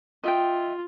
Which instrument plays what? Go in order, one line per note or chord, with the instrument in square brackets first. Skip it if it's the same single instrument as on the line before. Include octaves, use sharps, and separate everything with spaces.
[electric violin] F4 [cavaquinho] D#5 E5 G5